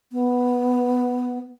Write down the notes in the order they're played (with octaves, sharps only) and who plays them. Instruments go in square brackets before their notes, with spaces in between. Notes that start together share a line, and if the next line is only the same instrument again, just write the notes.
[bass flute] B3